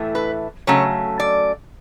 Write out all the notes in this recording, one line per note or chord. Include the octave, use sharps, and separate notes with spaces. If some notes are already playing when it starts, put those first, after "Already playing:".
Already playing: A2 E3 A3
B4
C#3 F#3 A3 C#5
D5